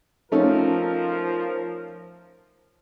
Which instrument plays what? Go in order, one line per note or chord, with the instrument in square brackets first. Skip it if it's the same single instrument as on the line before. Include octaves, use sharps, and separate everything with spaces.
[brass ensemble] F3 A#4 [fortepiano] A3 C#4 D#4